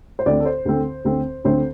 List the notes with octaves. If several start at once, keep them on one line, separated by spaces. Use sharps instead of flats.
C5
D2 D3 C4 D5
A4
C5
D2 D3 C4
D2 D3 C4
D2 D3 C4 C5